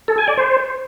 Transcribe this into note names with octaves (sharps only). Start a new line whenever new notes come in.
A4
G#5
D5
C5